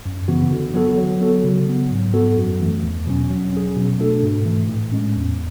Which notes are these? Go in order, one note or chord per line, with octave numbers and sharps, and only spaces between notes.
F#2
C#3 E3 B3 F#4
D3
F#3 B3 F#4 A4
F#3
B3 F#4 A4
C#3
F#3 B3
G#2
F#3 B3 F#4 A4
F#2
E3 A3
E2
B2 F#3 C#4
F#3
C#4 G#4
B2
A3 D4 F#4 A4
G#2
E3 A3
A2
G#3 C#4
E2